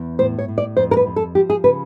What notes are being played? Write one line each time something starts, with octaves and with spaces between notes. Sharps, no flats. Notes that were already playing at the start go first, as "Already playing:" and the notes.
Already playing: E2
A2 C5
C#5
A2
D5
F2 C5
A#4
B4
F2
A4
F3 G4
G#4
C#3 B4